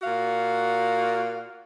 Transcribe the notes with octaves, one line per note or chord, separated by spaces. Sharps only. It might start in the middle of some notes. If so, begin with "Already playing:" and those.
A#2 F#4 F5